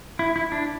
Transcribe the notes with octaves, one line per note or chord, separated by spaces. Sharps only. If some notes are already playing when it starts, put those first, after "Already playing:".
E4
E4
D4